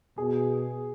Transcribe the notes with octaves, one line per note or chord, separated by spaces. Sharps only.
B2 G#4